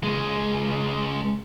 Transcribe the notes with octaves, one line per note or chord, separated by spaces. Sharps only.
C#2 G#3